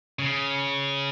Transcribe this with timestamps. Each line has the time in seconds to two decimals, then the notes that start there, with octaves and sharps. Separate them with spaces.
0.19 C#3